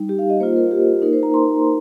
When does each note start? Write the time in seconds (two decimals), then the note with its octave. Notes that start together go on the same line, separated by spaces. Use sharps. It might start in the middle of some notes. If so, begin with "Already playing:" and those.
Already playing: G3 D#4
0.09 G4
0.19 F5
0.30 D#5
0.40 A#3 C5
0.43 F4
0.56 A#4
0.71 G4
1.02 D#4 A#4
1.06 A#3
1.13 C5
1.23 A#5
1.34 C6